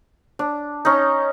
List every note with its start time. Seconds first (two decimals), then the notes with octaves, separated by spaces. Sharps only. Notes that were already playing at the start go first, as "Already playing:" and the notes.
0.39 D4
0.85 C#4 D#4